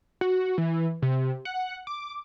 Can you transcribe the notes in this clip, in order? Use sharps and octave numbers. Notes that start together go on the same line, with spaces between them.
F#4
E3
C3
F#5
D6